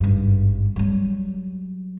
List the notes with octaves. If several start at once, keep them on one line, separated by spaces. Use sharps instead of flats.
G#1 G2
F#3 G3